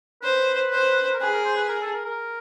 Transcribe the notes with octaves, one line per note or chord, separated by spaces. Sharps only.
B4 C5
C5
A#4
G#4 B4
A#4
C5
B4
A#4
A4
A#4
A#4